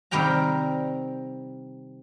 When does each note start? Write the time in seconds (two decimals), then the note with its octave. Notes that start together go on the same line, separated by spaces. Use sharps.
0.11 C3 D#3 G3 A#4 G5 A#5